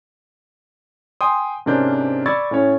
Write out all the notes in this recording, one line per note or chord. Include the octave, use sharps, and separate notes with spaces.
G5 G#5 C6 D#6
G#2 C3 C#4 D4 A#4 G6
D5 B5 C#6 E6 G#6 A6
A2 C#4 C#5